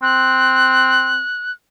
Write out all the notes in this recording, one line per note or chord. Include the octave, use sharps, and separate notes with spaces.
C4 F#6